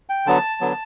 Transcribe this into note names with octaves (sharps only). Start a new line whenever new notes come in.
G5
D3 F#3 B3 A5
D3 F#3 B3